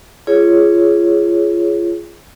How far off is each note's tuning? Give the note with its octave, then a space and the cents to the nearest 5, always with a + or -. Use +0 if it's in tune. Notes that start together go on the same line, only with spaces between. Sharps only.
F4 -30 G#4 +0 C#5 +0